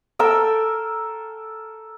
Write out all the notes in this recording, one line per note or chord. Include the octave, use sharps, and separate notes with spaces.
A4 A#4 G5 E6